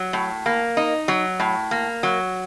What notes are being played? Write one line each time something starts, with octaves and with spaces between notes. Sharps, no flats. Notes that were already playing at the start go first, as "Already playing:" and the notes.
Already playing: F#3
A2
A#3
D#4
F#3
A2
A#3
F#3